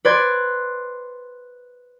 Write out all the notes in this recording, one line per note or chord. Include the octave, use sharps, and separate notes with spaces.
B4 C5 D5 C6 G#6